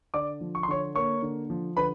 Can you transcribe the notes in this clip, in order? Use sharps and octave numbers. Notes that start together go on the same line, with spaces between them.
D3 D5 D6
F3
C#6
C6
D3 C#5 C#6
A#3 C#5 C#6
D3
F3
D3 B4 B5